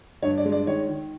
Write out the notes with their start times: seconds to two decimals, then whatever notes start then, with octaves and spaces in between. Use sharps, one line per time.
0.22 G2 C#5
0.38 D5
0.45 G#3
0.52 D5
0.67 D#3 C#5
0.89 D#3